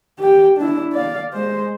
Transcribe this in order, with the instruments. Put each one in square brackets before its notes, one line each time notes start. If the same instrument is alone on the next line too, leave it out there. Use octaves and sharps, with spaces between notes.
[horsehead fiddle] G4 G5
D4 E4
D5 F5
G#3 C5